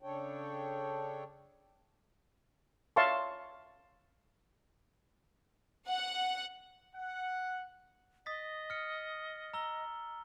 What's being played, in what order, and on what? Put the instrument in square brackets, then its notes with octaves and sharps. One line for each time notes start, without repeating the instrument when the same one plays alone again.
[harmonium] C#3 D4 A4 C#5 G5
[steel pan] C#5 E5 F5 A5 C6 C#6
[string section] F#5
[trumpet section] F#5
[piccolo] D#5 [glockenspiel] D#6 A6 B6
[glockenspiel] F6 C#7
A#5 E6 G7